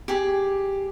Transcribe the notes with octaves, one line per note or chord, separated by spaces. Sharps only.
G4 G#4